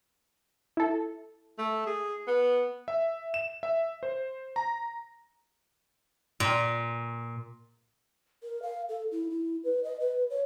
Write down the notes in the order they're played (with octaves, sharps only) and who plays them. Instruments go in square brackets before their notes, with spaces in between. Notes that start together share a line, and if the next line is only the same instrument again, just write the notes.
[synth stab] E4 A4
[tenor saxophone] A3
G#4
B3
[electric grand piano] E5
E7
E5
C5
A#5
[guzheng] A#2
[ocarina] A#4
F5
A4
E4
E4
B4
D#5
B4
C#5